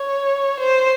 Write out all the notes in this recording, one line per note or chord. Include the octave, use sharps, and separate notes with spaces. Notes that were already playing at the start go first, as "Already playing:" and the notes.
Already playing: C#5
C5